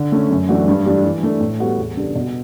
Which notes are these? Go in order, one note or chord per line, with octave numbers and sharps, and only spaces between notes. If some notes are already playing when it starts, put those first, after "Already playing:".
Already playing: D3
A3 C#4
F#2
E3 A3 D4 F#4
G2
E3 A3 D4 G4
E3
A3 D4 A4
A2
G3 B3 F#4 A4
E2
C#3 G3 D4 A4
B2